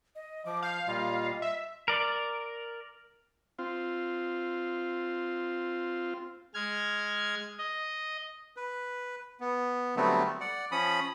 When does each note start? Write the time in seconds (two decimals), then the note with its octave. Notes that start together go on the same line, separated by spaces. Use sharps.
0.15 D#5
0.46 F3 D6
0.63 F5 G6
0.87 A#2 G3 F4 D#5
1.42 E5
1.88 A#4 D5
3.59 C4 F4
6.54 G#3 F6 G#6
7.59 D#5
8.57 B4
9.40 B3
9.96 D3 F#3 G3 A3 B3 C4
10.41 D5 F#5
10.72 F3 C#4 B5 D#6